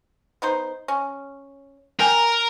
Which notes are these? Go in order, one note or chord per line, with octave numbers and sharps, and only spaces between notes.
B3 D#4 C5
C#4
A#4 G5 G#5